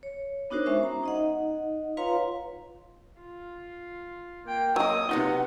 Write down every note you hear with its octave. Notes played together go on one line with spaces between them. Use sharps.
C#5
B3 D4 D#4 F#4 A#4 C5
G#3 C#4 C5 E5
A#5
D#4 D#5 F#5
F4 B4 C#5 F5 A#5 C6
F4
A#3 G5
F#3 A#3 D#5 D#6
C3 B3 D#4 F4 F#5